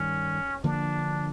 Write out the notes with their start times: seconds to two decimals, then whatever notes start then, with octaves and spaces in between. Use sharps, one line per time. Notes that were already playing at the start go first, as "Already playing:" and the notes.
Already playing: G2 D#3 G3 C#4
0.63 D3 F3 A#3 D4